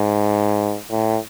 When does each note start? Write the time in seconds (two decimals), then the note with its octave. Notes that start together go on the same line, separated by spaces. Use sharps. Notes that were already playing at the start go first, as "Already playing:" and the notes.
Already playing: G#2
0.90 A2